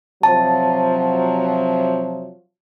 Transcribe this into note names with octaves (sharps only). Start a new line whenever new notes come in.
C3 F3 F#3 A5